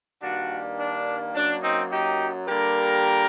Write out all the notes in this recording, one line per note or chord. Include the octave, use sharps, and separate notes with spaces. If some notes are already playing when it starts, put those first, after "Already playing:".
G2 D#3 G3 A#3 D4 F#4
D4
F#2 F#3 A#3 D4
C4 D#4
D#4 G4
D3 G3 A#3 G4 A#4